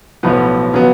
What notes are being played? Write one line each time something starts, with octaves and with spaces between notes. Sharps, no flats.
B1 A2 F3 B3
C#3 F#3 B3